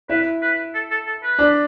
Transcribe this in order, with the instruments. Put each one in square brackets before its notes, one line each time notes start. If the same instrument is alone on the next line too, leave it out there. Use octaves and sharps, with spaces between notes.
[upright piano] E4 E5 [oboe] B4
[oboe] B4
A4
A4
A4
B4
[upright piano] D4 D5